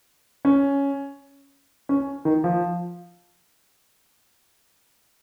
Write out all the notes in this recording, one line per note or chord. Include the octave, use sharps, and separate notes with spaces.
C#4
C#4
D#3
F3